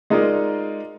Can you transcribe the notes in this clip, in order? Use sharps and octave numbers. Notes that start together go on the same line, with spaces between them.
G#3 D#4 F4 A#4 D5 D#5